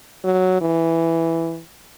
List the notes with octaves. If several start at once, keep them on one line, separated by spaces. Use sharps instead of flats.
F#3
E3